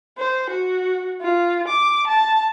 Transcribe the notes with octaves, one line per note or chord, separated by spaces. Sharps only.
C5
F#4
F4
D6
A5